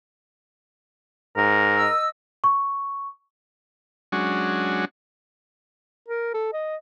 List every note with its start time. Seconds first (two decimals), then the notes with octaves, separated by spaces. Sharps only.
1.36 G#2 A#4
1.76 D#5 E6
2.44 C#6
4.12 F#3 G#3 C#4 D4 F#4
6.08 A#4
6.34 A4
6.53 D#5